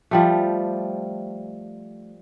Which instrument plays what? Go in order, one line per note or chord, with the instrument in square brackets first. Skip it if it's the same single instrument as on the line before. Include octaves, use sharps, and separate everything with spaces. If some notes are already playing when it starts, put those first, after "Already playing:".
[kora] F3 G3 A3